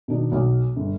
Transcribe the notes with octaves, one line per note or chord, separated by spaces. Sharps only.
B2 D#3 D4 D#4
B1
G1